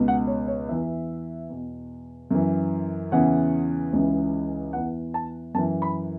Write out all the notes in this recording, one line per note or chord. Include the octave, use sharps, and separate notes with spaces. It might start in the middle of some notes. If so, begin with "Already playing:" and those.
Already playing: C#2 B2
F#5
C#5
C#5
E2 E3 E5
E2 B2
F#2 E3
E2 C#3 E3 F#5
C#2 C#3 E3
E2 E3 F#5
A5
F#2 E3 A5
B5